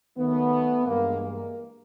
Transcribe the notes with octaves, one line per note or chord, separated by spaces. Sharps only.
D#2 D#3 F#3 A3 B3
G2 E3 G#3 A#3
A#3